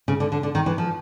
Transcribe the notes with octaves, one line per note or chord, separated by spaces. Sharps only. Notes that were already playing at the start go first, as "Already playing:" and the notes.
C#3
D3
D3
D3
D#3
E3
F3